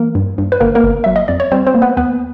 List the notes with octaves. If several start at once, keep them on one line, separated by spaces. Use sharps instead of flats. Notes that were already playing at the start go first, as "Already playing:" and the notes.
Already playing: E3 A#3 A#4
G2
G2
B4
G1 A#3 A#4
A#3 A#4
G1
F#3 E5
D#5
F2 D5
C#5
G3 C4 C5
C4 C5
A#3
B3 B4
D#2 B3 B4